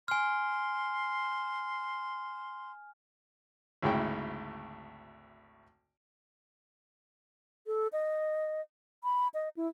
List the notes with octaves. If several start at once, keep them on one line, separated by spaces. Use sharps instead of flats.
G#5 C6 F6
G#1 D2 C#3 E4 G5
A4
D#5
B5
D#5
E4